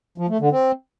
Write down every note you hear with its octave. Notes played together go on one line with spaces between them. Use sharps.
F3
A3
D3
C4